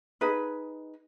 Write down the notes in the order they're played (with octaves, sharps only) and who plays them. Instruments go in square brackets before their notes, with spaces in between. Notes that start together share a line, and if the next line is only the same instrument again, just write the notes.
[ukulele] D#4 G#4 B4